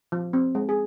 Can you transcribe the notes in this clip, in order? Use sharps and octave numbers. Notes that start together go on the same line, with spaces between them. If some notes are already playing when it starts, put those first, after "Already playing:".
F3
C4
G#3
G#4